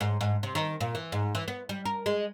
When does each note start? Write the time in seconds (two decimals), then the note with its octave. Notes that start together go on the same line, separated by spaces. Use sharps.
0.01 G#2
0.21 G#2
0.43 C3
0.55 D#3
0.81 A#2
0.95 E3
1.12 G#2
1.35 E3
1.48 B3
1.69 G3
1.85 A#4
2.06 G#3